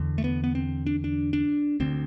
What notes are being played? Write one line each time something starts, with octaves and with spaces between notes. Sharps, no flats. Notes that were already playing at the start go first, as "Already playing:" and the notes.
Already playing: E2 D3
A3
B3
B3
C4
D4
D4
D4
D2 D3 C4